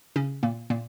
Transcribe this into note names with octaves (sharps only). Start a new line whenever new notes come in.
C#3 C#4
A#2 A#3
A#2 A#3